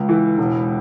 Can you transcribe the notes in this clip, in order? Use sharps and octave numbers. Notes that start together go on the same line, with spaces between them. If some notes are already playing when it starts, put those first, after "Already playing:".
Already playing: C#2
E3
E1